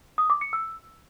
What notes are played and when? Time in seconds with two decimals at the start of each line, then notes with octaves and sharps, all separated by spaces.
0.18 D#6
0.30 D6
0.41 C#7
0.53 E6